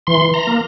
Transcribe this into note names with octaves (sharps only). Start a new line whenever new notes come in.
E3 C6
A#5
A#3